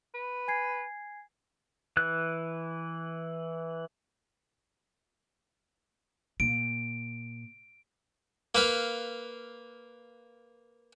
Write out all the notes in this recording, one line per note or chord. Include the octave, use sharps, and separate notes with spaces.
B4
G#5 G#6 C7
E3 F#6
A#2 D7
A#3 B4 F5